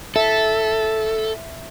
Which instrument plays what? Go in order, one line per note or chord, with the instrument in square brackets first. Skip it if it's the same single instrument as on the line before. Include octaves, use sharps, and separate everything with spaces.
[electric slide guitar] A4 [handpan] E5